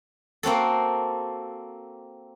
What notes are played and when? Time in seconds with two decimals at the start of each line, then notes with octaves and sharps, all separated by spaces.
0.43 A#3 C4 F#4 A4